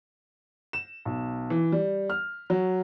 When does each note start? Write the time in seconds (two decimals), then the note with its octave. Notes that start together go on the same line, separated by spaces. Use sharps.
0.73 E7
1.05 B1
1.50 E3
1.72 G3
2.10 F6
2.50 F#3